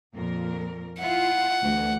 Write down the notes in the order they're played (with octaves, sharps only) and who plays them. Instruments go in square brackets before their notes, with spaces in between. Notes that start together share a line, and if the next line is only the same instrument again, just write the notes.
[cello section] F2 A#2 A#4
[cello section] E4 F4 [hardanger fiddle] F#5
[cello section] D2 E3